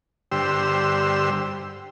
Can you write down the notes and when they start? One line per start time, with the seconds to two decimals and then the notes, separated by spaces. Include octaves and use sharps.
0.32 G2 D3 G4 C5 E6